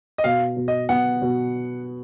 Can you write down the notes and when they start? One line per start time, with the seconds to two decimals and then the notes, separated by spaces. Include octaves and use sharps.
0.18 D#5
0.24 B2 F5
0.57 B2
0.68 D#5
0.89 B3 F#5
1.22 B2